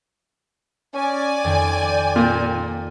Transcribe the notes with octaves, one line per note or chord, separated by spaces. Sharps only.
C#4 D5 G#5
F2 D#3 G5
A#2 G#6 A#6